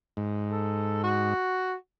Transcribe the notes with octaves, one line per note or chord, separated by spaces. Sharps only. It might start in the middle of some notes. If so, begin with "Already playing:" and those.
G#2
A4
F#4